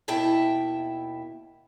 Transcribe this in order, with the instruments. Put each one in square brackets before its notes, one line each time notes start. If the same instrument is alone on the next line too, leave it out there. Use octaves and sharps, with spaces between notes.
[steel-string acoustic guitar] D#2 B2 E4 E5 G5 A5